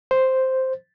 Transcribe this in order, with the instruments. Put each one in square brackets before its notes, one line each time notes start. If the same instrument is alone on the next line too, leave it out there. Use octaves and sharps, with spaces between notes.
[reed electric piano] C5